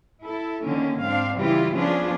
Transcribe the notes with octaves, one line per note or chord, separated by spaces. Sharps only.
E4 A4
D3 D#3 A#3 C#4
G#2 C4 D4 F5
C#3 E3 G3 E4 F4 G4
F3 B3 C#4 D4 F4 G#4